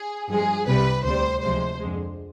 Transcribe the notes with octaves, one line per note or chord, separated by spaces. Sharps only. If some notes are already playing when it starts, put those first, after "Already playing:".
Already playing: G#4
G2 F3 G#3 G#4
C2 C3 G3 B4
D2 C3 G3 C5
D2 C3 F3 G#3 C5
F2 D3 G#3